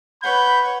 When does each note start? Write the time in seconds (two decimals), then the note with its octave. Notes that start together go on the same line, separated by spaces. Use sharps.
0.23 B4 C#5 F#5 B5 G6